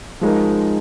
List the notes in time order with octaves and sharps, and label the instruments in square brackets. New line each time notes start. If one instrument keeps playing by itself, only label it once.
[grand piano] F3 G#3 D#4 A#4